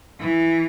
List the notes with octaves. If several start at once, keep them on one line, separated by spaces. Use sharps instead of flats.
E3